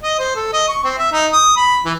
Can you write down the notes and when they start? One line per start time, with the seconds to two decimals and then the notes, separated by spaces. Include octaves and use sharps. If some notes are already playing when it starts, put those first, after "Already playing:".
0.03 D#5
0.19 C5
0.36 A4
0.53 D#5
0.68 C#6
0.84 C4
0.98 E5
1.12 D#4
1.33 D#6
1.57 B5
1.85 E3